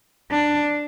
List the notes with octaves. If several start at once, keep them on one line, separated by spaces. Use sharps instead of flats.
D4